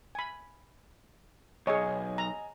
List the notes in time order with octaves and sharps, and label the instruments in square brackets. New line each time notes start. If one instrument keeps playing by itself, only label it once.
[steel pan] G#5 B5
[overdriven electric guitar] B1 [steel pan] G#4 C#5 [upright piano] D#5 G#5
[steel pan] A#5